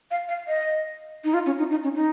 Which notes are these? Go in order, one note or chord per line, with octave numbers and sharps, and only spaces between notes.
F5
F5
D#5
D#4
F4
C#4
D#4
D#4
C#4
D#4